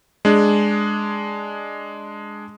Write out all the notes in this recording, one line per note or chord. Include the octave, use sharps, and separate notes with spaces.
G#3 D4 G#4